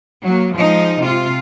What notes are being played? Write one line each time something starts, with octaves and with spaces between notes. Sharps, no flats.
F#3 A#3
F3 G#3 D#4
C3 F4